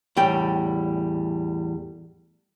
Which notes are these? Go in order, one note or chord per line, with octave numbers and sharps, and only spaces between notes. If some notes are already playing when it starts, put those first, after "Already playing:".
E2 A2 G3 G5